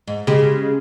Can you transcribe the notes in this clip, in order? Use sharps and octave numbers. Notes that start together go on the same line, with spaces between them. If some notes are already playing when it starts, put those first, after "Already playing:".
G#2
C#3 G#3 G4